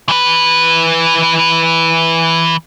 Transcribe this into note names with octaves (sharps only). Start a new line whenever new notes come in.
E3 B4